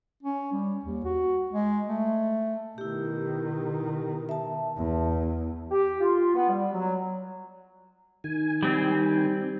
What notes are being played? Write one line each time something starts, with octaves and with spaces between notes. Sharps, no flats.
C#4
G3
D#2
F#4
G#3
A3
B2 D#3 E4 G4
E5 A5
E2
G4
F4
B3
G3
F#3
D#3 G#5
G3 C4